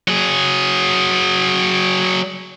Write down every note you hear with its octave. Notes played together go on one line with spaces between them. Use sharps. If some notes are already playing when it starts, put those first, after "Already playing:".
F#3 G#4